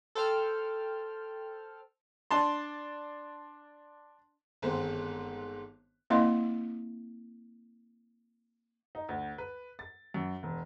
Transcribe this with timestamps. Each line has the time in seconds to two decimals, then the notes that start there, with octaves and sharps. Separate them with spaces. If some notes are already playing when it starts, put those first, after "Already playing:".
0.15 A4 C5 G5 F6
2.31 D4 A5 C6
4.62 G1 G#2 D#3 G#3 C4 C5
6.10 A#3 C4 E4 D#5 F5 C6
8.95 D#4
9.09 D2
9.38 B4
9.79 A6
10.14 F#2
10.43 E1